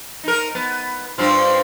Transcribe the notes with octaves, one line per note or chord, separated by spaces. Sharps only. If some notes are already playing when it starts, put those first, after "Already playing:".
D#4 A#4
B3
G2 C4 F4